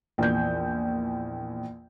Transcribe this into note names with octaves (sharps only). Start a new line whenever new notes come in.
A#1 E2 G6